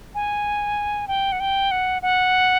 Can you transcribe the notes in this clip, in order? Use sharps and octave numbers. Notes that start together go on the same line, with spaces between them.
G#5
G5
F#5
G5
F#5
F#5